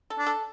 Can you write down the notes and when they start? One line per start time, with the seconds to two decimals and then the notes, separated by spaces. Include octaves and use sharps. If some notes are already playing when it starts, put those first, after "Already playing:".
0.10 A4
0.18 D4
0.27 A4